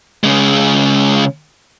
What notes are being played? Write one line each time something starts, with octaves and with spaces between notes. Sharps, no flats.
C#3 G#3